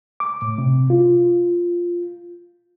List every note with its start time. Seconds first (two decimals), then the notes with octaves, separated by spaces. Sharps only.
0.20 D6
0.42 A2
0.58 C3
0.90 F4